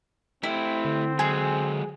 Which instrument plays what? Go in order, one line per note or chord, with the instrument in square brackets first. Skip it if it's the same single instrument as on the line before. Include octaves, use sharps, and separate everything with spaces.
[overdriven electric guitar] A3 G4 [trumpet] C4 [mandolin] E4
[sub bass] D3
[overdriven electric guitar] F#3 G#3 [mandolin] G#4